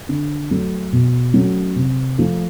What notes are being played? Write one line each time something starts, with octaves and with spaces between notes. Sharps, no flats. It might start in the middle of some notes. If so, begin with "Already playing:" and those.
D3
F#3 A3
B2
F#3 A3 C#4
C3
F3 A3